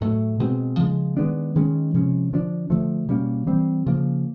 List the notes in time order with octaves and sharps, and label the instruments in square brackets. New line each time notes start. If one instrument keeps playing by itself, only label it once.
[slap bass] A2 F#3 A3
B2 G#3 C4
C#3 F3 G#3
D#3 G#3 B3 D4
D#3 G#3 C#4
C3 F3 G#3 C#4
D3 F3 A#3 D4
D3 F3 A3
B2 G3 A#3 C#4
E3 G3 C4
C#3 F3 A#3